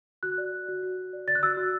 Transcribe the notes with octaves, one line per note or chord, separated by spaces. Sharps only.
F#4 F#6
D5
F#4
F#4
F#4
F#4
D5
D5 A6
F#6
F#4 E6
F#4